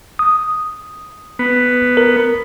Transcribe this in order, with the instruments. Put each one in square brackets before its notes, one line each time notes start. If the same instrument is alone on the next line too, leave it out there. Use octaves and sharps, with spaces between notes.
[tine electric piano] D#6
[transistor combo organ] B3
[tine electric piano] A#4